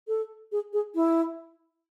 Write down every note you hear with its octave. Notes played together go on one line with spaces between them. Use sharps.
A4
G#4
G#4
E4